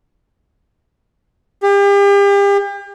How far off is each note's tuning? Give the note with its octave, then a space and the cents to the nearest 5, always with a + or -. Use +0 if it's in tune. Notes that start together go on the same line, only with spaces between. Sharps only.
G4 +40